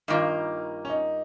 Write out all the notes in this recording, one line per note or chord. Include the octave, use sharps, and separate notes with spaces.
G2 D#3 A#3 D#4 F4
C#4
D#4